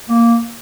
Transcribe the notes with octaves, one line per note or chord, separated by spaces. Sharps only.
A#3